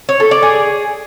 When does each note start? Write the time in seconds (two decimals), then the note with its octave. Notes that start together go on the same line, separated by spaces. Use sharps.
0.09 C#5
0.20 A4
0.31 D5
0.43 G#4